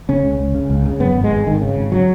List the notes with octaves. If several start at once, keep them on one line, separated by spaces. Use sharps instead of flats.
C#3 C#4
C#2
C#2
C#3
C#2
C#3
F#2 B3
G#1
G#3
G#1
G#1 D#3
C#3
G#1
C#3 F#3